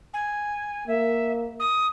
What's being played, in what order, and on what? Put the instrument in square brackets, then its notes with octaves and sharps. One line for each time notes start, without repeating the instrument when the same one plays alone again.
[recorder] G#5
[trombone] A#3 [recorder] E5
[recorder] D#6